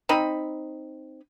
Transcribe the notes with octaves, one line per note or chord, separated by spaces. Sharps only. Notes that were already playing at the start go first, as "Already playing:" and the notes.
C4 D#4 B5